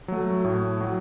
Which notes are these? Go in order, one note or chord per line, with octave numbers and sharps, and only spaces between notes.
F#3 A3
A2
F#3